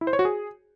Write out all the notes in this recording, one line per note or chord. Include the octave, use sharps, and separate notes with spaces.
E4
C5
C#5
F#4
G#4